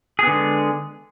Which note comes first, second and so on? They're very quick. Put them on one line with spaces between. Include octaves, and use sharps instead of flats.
G#4 B3 D3 G#3